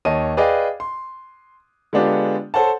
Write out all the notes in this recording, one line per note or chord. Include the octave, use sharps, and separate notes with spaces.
D#2 C#5 D#5 A5 D#7
G#4 B4 D5 D#5 F5 G5
C6
D3 G#3 B3 D4 F4 G4
A4 C5 C#5 F#5 A5